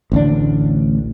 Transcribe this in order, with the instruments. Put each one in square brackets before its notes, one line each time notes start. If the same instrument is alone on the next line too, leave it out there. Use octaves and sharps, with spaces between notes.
[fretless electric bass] A1 D2 D4